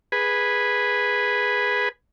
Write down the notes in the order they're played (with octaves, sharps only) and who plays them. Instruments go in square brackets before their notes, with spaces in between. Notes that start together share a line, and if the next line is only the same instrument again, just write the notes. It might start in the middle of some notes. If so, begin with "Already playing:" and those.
[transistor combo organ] G#4 B4